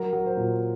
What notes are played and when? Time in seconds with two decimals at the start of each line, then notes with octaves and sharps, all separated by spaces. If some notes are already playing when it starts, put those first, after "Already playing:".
Already playing: F#3 A#4
0.13 F#3
0.26 C5
0.37 A#2